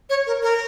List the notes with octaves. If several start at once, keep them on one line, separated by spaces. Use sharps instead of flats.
C#5
A#4
A#4